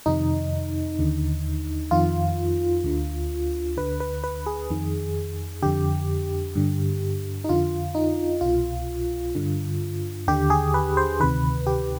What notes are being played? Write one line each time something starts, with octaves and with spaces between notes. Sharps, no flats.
F2 C3 D#3 D#4
D#2 D3
F2 D#3 F4
D2 D3
D2 D3 B4
B4
B4
G#4
F2 D#3
F2 D3 G4
G2 D3
D#4
F2 D3 F4
D#4
C2 B2 F4
G2 D3
D#2 D3 G4
G#4
B4
C5
D2 C3 D#3 B4
G4